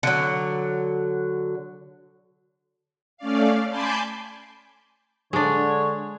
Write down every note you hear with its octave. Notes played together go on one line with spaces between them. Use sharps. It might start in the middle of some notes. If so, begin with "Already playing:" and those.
D3 F#3
A3 C#4 D5 F5
G#5 A5 B5 C6 D6 G6
D3 G#3 D4 C#5